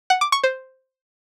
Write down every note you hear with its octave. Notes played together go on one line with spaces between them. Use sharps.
F#5
D6
C#6
C5